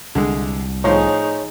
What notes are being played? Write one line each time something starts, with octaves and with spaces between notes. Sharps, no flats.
C2 D3 G#3
A2 F3 D#4 G#4 C5 C#5